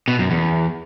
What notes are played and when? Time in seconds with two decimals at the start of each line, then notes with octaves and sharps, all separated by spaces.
0.08 B2
0.19 F#2
0.31 E2